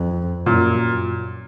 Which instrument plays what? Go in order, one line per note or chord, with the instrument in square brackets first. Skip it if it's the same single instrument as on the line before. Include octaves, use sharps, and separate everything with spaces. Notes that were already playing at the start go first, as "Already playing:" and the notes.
Already playing: [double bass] F2
[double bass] F#2 [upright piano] A#2